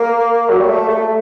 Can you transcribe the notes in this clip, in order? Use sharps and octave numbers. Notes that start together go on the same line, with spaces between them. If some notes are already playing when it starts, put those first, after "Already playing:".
Already playing: A#3
F#3
G3
A3
A3